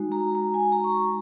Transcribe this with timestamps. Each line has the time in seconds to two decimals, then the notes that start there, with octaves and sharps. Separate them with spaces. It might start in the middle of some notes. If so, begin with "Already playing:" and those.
Already playing: G#3 D#4 F#4
0.12 A#5
0.35 A#5
0.54 G#5
0.72 A#5
0.84 C#6
0.90 A#5